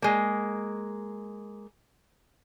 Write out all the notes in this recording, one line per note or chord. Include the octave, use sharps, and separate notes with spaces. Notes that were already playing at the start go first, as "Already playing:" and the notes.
G#3 A#3